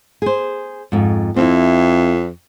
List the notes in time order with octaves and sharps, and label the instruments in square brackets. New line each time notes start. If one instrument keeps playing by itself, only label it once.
[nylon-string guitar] G#4 C5
F2 G#2
[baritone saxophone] F2 [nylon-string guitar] C4 E4